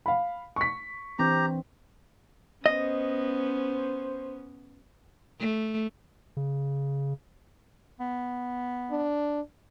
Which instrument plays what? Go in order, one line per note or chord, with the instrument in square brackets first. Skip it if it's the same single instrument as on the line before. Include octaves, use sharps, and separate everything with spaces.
[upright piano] F5 B5
C#6 B6
[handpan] E3 C4 D4 [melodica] G4 A#5
[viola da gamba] B3 C#4 [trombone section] C5 [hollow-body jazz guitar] D#5
[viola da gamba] A3
[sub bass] C#3
[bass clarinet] B3
[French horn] D4